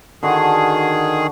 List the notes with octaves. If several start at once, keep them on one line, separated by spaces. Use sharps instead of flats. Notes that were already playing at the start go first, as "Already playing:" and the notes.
D3 D#3 F#4 G#4